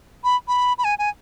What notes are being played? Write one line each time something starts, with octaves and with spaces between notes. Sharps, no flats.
B5
B5
B5
G#5
G#5